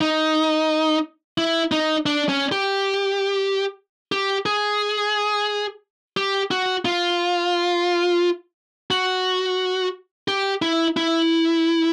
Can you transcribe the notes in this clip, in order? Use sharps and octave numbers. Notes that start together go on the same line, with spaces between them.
D#4
E4
D#4
D4
C#4
G4
G4
G#4
G4
F#4
F4
F#4
G4
E4
E4